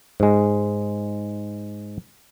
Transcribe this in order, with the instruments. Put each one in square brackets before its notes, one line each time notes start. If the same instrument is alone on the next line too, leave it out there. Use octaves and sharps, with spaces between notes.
[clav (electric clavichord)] G#2 G#3